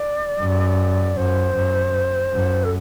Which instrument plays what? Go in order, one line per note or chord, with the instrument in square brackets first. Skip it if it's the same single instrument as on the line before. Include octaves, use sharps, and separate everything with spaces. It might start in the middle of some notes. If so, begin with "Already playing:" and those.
Already playing: [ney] D5
[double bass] F#2
[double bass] F#2 [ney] C5
[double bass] F#2
F#2
[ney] A4